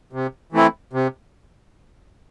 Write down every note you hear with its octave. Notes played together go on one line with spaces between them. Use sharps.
C3
E3 A3 C4 E4
C3